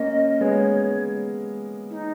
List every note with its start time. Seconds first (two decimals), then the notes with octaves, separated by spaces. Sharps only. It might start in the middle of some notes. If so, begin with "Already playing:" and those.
Already playing: A#3 C#4 D#5
0.41 G#3 B3 C#5
1.89 E4
1.93 D#4